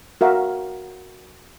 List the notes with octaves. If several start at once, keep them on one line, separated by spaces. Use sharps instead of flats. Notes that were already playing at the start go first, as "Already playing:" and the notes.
F#4 A#4 E5 F5